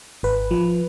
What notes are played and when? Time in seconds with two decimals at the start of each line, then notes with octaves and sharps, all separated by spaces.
0.23 G#1 B4
0.51 F3